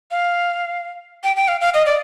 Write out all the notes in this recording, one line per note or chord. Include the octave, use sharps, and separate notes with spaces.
F5
G5
G5
F5
F5
D#5
D5